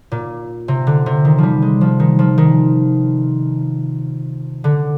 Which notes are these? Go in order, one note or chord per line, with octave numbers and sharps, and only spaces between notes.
A#2
C3
D3
C3
D#3
F3 G3
G#3
F3
D#3
F3
D#3
D3